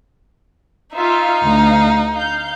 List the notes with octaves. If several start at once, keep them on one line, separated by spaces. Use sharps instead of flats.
D#4 F4 E5
D2 F5
F5 G6